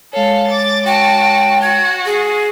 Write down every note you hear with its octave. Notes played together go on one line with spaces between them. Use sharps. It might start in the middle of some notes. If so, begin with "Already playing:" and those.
G#3 A4 C#5 F5
D6 A6
F#4 G5 A5
F#4 G#6
G#4